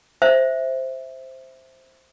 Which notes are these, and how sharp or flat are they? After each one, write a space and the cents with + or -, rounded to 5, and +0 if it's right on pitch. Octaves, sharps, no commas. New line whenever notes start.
C5 +0 E5 -5